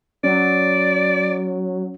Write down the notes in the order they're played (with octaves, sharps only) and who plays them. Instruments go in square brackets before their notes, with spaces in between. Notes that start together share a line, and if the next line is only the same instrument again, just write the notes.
[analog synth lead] F#3 [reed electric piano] C#4 [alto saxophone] D5